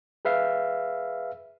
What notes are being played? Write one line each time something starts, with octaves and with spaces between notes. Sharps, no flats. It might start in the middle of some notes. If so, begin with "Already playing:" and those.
G#4 B4 E5 F5